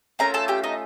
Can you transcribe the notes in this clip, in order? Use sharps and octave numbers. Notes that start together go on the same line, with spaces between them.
A3 C#4 F4 A#4 A#5
A4 A5
G4 G5
D#4 D#5